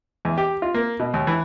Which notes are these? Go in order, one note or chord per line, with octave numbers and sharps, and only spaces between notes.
E2
G4
F4
A#3
B2
D#2
E3